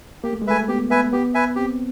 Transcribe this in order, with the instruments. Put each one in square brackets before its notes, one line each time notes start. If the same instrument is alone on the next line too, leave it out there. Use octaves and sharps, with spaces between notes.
[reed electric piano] A#3 [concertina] G4
[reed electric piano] A3
G#3
[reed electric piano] A3 [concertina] B4 E5 G#5
[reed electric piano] B3 [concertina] G4
[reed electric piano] B3 [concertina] B4 E5 G#5
[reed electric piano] B3 [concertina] G4
[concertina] B4 E5 G#5
[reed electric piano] C4 [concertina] G4